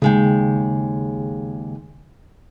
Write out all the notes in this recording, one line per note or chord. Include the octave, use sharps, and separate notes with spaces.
D#2 C#3 G#3 G5